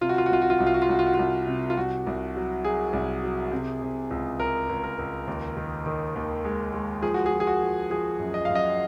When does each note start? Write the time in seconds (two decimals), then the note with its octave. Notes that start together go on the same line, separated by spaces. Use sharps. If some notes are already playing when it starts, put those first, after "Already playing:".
0.01 C3 F4
0.09 F#4
0.18 F4
0.26 F#4
0.30 C2 F4
0.42 F#4
0.50 F4
0.58 C2 F#4
0.67 F4
0.74 F#4
0.82 F4
0.89 C2 F#4
0.99 F4
1.07 F#4
1.14 C2 F4
1.47 C3
1.70 F4
1.76 C2 F#4
2.07 C2
2.36 F#3
2.65 F#3 G#4
2.93 C2
3.23 F#3
3.52 C3
3.82 C3
4.10 C#2
4.39 C#2 A#4
4.69 C#2
4.84 A#4
4.99 C#2
5.27 D#2
5.57 D#3
5.86 D#3
6.16 D#2
6.45 G#3
6.73 G#3
7.03 F3 G#4
7.14 F#4
7.26 G#4
7.31 F3
7.40 G#4
7.47 F#4
7.62 F3
7.90 F3 G#4
8.19 F#2
8.34 D#5
8.45 F#2 F5
8.55 D#5